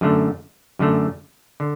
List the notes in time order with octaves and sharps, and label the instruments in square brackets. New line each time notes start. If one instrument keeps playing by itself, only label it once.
[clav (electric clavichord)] F#2 D3 A3
F#2 D3 A3
D3